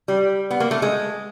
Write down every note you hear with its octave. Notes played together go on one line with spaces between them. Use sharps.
G3
B3
A#3
A3
G#3